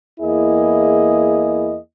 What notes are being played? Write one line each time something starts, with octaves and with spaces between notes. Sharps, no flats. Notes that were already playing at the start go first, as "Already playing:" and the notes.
E2 A#3 E4 G#4 D#5